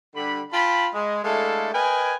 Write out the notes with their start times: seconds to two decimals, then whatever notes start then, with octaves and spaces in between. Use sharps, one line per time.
0.14 D3 G3 B5
0.52 F4 G5 A5 B5
0.93 G#3
1.24 G#3 A3 D4 E4 A4 F5
1.72 A#4 B4 D#5 G5 G#5